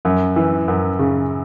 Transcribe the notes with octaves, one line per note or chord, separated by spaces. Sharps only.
F#2
E3
F#2
C#3